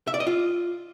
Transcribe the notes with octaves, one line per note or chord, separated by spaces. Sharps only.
E5
D5
D#5
F4